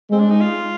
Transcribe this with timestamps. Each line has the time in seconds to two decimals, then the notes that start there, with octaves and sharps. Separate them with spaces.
0.11 G#3 C4
0.20 D4
0.30 D#4
0.41 F4